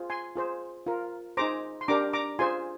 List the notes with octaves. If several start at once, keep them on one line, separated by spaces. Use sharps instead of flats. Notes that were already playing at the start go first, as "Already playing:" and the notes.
Already playing: F4 G#4 C5
G#5 C6
F4 G#4 C5
F4 A#4
D#4 G#4 C5 A#5 D6
C6
D4 G4 A#4 A#5 D6
A#5 D6
F4 G#4 C5 G#5 C6